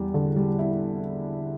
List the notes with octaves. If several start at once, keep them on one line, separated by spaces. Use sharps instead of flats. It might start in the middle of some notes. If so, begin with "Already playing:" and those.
Already playing: E2 G3
D3
G3
E4